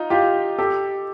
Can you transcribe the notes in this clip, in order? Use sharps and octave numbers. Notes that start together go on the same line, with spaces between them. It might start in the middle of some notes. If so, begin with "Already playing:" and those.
Already playing: D#4 F4
F4 G4
G4 A4